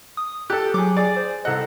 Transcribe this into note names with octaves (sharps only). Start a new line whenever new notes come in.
D#6
G4 A4 F#6
F#3 G#4 D6
G#4 D5
C5
C2 A4 D#5 F#5